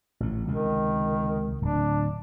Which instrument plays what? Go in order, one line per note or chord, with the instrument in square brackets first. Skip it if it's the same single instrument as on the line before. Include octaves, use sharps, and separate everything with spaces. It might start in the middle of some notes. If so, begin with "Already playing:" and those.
[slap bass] A1 A2
[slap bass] C#2 C3 [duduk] D#3
[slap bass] D1 [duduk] D4